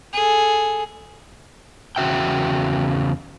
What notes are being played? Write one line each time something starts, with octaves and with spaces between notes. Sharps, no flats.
G#4 A4
E2 C#3 F#4 E5 G5